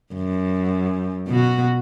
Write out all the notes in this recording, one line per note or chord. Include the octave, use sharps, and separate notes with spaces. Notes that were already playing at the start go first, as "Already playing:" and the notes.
F#2
B2 F#4